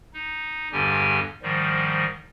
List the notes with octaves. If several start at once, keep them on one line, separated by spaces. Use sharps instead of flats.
D#4
E2 G2 D3 G3 G4 G#5
G#2 D#3 F3 G3